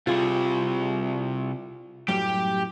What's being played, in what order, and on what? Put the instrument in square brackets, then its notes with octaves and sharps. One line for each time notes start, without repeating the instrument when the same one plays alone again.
[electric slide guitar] C3 G3 [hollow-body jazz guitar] F4 G#4
[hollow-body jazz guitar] F#2 A2 G3 [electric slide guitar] G4